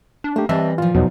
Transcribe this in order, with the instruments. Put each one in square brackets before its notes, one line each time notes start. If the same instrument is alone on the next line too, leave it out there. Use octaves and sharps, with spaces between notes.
[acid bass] D4
[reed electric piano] A3 G4 [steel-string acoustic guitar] A#3
[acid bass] E3 [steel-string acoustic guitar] G3 C4 D#5 [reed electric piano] E5 A5
[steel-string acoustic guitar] A#2 F3 [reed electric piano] F4
[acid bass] E2 [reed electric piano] B2 F#3 D#4